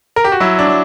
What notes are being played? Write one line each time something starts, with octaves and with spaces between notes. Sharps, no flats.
A#4
G4
F#4
F#3 E4
D4
F#3